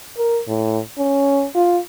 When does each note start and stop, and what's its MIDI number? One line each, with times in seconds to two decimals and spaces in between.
0.18 0.40 70
0.48 0.79 45
0.98 1.46 61
1.55 1.78 65